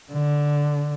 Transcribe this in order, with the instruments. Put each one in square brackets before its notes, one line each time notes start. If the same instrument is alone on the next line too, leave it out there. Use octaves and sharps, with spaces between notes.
[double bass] D3